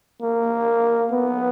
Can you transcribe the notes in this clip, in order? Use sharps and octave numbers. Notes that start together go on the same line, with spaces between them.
A#3
B3